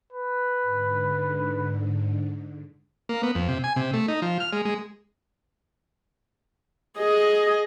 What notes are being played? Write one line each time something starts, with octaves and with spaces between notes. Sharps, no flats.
B4
G#2 D3
A#3
B3
F2
C3
G#5
C3
A3
D#4
F3
F6
G#3
G#3
G#4 D#5